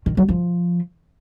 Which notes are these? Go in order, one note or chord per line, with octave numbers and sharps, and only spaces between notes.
D#3
F#3
F3